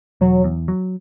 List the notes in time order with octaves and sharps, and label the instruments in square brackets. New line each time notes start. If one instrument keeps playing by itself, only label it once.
[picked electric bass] E1 [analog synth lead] F#3
[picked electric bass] E2
F#3